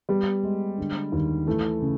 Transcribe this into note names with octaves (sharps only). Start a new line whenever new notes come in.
G3 B3
G#3
D3
D#2
E3 A3
C#3